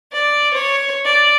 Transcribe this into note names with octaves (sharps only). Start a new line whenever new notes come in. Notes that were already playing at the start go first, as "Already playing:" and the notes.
D5
C#5
D5